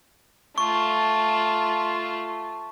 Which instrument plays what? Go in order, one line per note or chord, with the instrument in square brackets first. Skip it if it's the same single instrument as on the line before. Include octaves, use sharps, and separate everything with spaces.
[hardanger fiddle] A3 F4 [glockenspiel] C#6